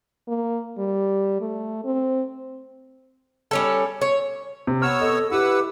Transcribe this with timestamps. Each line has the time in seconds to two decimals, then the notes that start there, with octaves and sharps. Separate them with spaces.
0.28 A#3
0.78 G3
1.41 A3
1.85 C4
3.51 G3 C#4 A4
4.01 C#5
4.67 C3
4.82 B3 C#5 E6 F6
5.01 A4 D#5
5.31 E4 G4 B4 F#5 E6